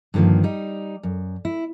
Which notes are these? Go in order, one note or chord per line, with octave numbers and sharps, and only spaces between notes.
G2 D3 D#3 F3 A#3
G3 D#4
F#2
E4